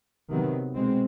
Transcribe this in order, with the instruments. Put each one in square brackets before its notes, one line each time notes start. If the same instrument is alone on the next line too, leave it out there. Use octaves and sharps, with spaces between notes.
[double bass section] C3 D#3 F#3 B3
B2 G#3 C4